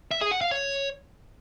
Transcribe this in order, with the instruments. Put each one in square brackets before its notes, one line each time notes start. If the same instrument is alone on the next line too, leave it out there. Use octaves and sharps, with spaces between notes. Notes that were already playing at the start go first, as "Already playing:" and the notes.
[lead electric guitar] E5
G#4
F#5
F5
C#5